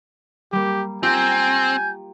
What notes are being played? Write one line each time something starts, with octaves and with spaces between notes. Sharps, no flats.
G3 A#3 G4
C4 F4 G4 G#5 A#5 G6